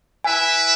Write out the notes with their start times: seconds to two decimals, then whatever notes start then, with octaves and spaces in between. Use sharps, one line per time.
0.24 E4 B4 E5 G#5